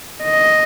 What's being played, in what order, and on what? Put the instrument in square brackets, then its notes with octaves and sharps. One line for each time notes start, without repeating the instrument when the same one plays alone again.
[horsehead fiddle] D#5